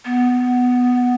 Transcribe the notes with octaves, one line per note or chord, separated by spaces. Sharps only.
B3